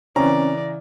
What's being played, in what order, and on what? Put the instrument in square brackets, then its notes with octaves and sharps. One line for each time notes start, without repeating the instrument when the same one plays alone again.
[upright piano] C#3 E3 [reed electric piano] C4 C#4 [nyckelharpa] D5 [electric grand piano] A#5